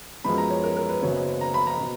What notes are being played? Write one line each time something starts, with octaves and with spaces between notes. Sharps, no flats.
F#2 F3 G#3 B3 B5
A#5
C#5
A#4
A#4
B4
F#1 F#2 C#3 F#3 B3 C#5
A#5
B5
A#5
B2